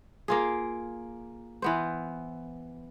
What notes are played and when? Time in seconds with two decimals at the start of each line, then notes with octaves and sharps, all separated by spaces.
0.28 A#3 F4 G#4
1.62 E3 B3 C5